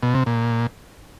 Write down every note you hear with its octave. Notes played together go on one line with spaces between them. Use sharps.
B2
C3
A#2